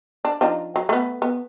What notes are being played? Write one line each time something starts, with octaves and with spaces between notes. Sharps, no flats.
D4
F3 D4 D#4
F#3
A3 B3
B3